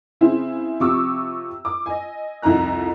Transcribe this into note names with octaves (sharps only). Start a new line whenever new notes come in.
C#3 C4 E4 G#4 C5
C3 F3 G4 C#6 D6 E6
D6
D#5 G#5
C2 F2 D#4 A#5 F#6